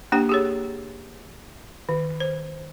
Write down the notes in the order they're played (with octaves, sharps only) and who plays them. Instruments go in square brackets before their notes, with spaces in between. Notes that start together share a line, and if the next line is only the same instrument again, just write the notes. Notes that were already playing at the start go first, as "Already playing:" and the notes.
[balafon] A#3 D4 G4 G5
G4 G#4 C#5
D#3
C5